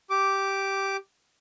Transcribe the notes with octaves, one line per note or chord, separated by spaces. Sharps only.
G4 D6